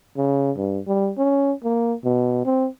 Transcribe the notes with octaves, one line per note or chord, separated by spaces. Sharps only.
C#3
G2
G3
C#4
A#3
B2
C4